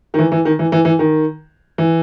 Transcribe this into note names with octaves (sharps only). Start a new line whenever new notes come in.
D#3
E3
E3
D#3
E3
E3
E3
D#3
E3